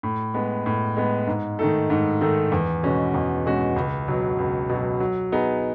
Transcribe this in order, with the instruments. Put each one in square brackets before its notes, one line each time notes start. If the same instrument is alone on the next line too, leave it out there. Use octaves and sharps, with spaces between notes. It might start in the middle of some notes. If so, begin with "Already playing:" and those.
[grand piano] A2
G#3 B3
A2
G#3 B3
G#2
D#3 A3 D#4 A4
G#2
D#3 A3 D#4 A4
E2
B2 G#3 C#4 F#4
E2
B2 G#3 C#4 F#4
C#2
B2 F#3
C#2
B2 F#3
F#3
B3 D#4 G#4